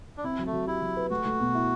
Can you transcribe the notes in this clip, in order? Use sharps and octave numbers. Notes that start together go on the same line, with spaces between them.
D4
C4 E4
F#3
A3
F#3
E4 G4
F#3
B4
A3 F#4
A3
B2
E4